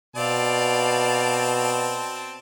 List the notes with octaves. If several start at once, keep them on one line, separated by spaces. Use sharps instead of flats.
B2 C4 D5 F5 A5